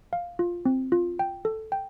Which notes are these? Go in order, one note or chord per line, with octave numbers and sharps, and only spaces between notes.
F5
F4
C4
F4
G5
A4
G5